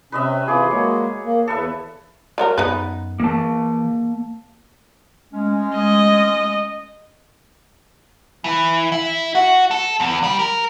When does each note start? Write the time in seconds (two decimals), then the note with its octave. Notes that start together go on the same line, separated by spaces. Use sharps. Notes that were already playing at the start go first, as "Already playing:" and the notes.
0.12 C3 C#4 B4 D#5 E5
0.48 C3 E3 F4 G#4 D6
0.71 F#3 G#3 A#3 C#5
1.24 A#3
1.47 E2 A4 B4 E5
2.38 F#3 F4 A#4
2.58 F#2 B3 D#4 B4
3.20 E3 A#3 A5
5.33 G#3 A3 C#4
5.76 D#5
8.44 E3
8.92 E4
9.35 F#4
9.71 A4
10.00 E2
10.24 G3
10.39 A#4